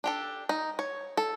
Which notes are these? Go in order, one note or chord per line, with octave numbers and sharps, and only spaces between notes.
D4 G4 A4
D#4
C#5
A4